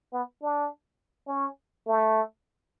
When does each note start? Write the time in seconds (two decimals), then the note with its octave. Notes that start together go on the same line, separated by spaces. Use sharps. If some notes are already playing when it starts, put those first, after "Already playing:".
0.13 B3
0.42 D4
1.28 C#4
1.86 A3